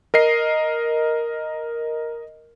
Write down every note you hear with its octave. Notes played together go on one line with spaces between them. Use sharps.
A#4 D#5 C7